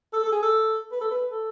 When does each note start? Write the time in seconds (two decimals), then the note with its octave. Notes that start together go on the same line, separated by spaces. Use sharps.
0.13 A4
0.23 A4
0.32 G#4
0.43 A4
0.92 B4
1.01 A4
1.11 B4
1.31 A4